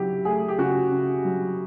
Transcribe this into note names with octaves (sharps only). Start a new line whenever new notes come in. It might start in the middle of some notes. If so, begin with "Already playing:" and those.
Already playing: C#3 F#3 E4 G4
A3 G#4
G4
C#3 F#4
C#3
F#3